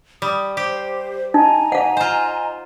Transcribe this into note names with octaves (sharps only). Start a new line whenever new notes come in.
G3 D#6
G4 C5
D#4 D#5 G#5 A#5
F5 F#5
F4 C5